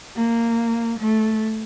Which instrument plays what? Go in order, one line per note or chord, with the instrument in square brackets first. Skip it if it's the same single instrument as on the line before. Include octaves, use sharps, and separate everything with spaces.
[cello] A#3
A3